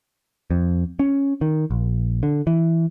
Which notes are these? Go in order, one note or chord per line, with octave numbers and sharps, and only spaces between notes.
F2
C#4
D#3
A#1
D3
E3